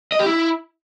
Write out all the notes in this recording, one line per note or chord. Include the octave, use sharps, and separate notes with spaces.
D#5
G4
E4